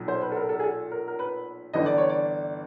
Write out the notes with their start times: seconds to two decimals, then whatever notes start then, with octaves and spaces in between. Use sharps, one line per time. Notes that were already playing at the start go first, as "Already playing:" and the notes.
Already playing: B1 A#2 F#3
0.08 C5
0.22 B4
0.32 A4
0.36 A#4
0.49 A4
0.59 G#4
0.64 A4
0.91 A#4
1.08 A#4
1.19 B4
1.73 G1 G2 E3 D#5
1.86 D5
1.98 C#5
2.09 D5